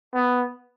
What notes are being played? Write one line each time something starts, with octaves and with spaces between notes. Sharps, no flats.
B3